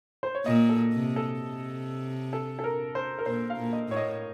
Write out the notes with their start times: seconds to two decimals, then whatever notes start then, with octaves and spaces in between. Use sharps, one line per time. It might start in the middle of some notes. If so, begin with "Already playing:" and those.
0.23 C5
0.35 C#5
0.46 A#2 D#5
0.69 A4
0.92 C3
1.16 A4
1.40 C3
2.33 A4
2.59 A4
2.64 A#4
2.95 C5
3.19 A#4
3.26 A#2 C5
3.50 F5
3.58 A#2
3.73 D#5
3.89 A2 C#5
3.96 D#5